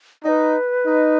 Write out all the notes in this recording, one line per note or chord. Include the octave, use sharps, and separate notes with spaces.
D#4 B4 D5
D#4